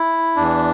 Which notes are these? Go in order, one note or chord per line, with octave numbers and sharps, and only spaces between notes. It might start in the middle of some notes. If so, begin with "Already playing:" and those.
Already playing: E4
E2 E3 D4